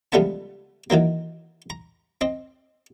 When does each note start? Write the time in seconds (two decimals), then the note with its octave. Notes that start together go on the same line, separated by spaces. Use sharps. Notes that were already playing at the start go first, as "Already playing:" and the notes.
0.12 C#2 F3 G3 A3 B3 A5
0.90 D#3 E3 F#3 A#3
1.70 A#5
2.21 C4 D#5